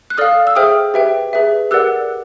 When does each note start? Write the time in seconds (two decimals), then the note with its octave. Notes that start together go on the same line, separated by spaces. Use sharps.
0.10 F#6
0.18 A4 D5 F5 D#6 F6
0.47 E6
0.55 G#4 C5 E5 G5 D#6 F6
0.94 G4 B4 E5 G5
1.33 G#4 B4 E5
1.71 G4 A#4 D5 F#5 E6 F#6